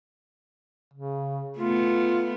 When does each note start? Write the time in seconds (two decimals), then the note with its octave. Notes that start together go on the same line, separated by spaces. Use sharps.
0.94 C#3
1.58 A3 B3 F4